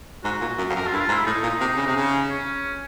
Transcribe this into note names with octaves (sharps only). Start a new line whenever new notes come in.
G#2 F#4
A#2
F#2
F2
F#2 A#4
F4
G2 E4
F4
G#2
E4
A2 D#4
A#2
C3
C#3
C3
C#3
C#4